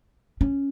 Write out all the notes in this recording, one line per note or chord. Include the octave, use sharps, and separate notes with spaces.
C#4